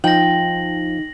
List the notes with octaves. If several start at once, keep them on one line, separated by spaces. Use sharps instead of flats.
F3 D#4 G5 A#6 F#7